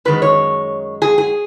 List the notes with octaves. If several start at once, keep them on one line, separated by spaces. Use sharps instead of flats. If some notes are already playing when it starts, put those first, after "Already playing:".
F#2 D#3 G#3 B4
C#5
G#4
G#4